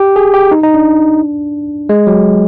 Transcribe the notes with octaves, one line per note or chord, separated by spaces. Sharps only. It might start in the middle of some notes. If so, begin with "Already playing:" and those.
Already playing: G4
G#4
G4
D#4
D#4
D4
G#3
F#3